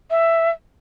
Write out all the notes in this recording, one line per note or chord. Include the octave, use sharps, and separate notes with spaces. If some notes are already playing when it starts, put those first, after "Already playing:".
E5